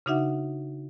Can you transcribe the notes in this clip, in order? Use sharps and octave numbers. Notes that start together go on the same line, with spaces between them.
C#3 D4 D#4 F#4 E5 F#5